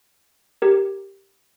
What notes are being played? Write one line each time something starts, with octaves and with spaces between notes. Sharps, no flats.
G4 A#4